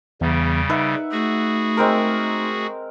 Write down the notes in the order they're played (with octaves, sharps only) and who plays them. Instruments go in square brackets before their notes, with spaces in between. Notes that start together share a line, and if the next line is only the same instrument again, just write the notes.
[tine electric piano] E2 [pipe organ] C#3 G3
[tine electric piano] D#4 [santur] B4 E5 F#5
[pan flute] A3 [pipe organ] F#4 G#4
[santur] G#3 C4 A#4